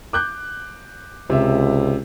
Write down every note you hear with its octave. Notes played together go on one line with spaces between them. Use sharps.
D6 F#6 G6
C#2 C3 E5